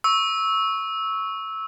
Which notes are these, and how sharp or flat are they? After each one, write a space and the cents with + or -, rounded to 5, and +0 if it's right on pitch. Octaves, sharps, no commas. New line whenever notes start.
C#6 +0 E6 -15